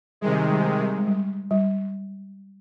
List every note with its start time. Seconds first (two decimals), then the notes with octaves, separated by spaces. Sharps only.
0.21 C3 D#3 G3 G#3
0.51 G3
0.79 G3
0.98 G#3
1.07 G3
1.51 G3